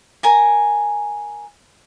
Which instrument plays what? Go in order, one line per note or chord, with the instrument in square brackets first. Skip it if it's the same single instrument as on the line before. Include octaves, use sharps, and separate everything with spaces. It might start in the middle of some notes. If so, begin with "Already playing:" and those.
[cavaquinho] A#4 G#5 A#5